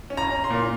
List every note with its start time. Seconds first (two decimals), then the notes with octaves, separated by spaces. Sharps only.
0.10 C#4
0.17 A#5
0.30 C#4
0.44 C6
0.50 A#2